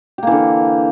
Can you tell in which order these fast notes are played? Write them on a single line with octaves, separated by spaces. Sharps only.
G4 A#3 E3 D3